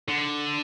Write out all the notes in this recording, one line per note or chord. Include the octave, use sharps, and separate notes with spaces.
D3